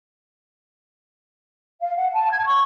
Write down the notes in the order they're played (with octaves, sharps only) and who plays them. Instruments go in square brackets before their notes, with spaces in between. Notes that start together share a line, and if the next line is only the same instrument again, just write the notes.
[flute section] F5
F#5
A5
G#6
C#6